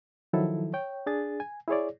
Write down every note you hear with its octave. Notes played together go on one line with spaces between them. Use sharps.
D#3 F3 F#3 E4 A4
C#5 G5
D4 G#4 A6
G#5
E4 G#4 C#5 D5